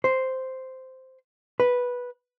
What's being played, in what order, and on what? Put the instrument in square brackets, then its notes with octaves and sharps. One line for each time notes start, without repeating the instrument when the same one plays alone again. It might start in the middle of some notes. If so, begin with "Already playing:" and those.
[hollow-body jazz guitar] C5
B4